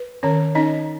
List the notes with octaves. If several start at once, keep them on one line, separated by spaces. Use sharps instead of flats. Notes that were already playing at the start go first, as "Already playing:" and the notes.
Already playing: B4
D#3 C#4 C#5
C#4 D#4 D#5